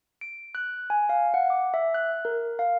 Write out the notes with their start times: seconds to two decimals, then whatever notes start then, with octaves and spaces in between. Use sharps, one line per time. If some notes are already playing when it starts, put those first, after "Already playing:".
0.21 D7
0.55 F#6
0.90 G#5
1.09 F5
1.34 F#5
1.50 D6
1.74 E5
1.94 F#6
2.25 A#4
2.59 F5